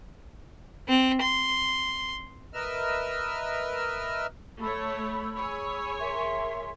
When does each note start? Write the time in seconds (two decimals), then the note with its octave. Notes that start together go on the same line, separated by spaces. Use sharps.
0.88 C4
1.22 C6
2.53 A#4 B4 D#5 E5 E6 F6
4.61 A3 C#5 B5 E6
5.36 G#4 C#5 G#5
5.99 A#4 E5 C6